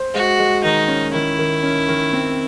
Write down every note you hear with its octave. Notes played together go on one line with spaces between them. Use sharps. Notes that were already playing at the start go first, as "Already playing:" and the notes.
Already playing: C5
G#3 F#4
G#3
D#3 D#4
C#4
D#3 E4
D#3
C#4
D#3
C4